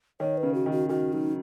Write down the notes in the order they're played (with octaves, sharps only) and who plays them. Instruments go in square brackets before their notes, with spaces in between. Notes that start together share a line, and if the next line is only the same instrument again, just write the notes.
[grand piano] D#3 [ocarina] C#5
[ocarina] B4
[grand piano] C#3
[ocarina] F#4
[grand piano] D#3
[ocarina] F#4
[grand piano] D#3 [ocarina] F#4
[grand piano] F#3 [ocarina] D#4